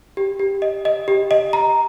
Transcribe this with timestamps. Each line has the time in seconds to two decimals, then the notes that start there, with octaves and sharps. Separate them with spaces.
0.17 G4
0.39 G4
0.62 D#5
0.85 D#5
1.08 G4
1.31 D#5
1.53 A#5